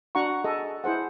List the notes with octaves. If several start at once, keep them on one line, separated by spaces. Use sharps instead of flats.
D4 F#4 F#5 A#5 C#6
G#4 A4 D#5
E4 G#4 C5 F#5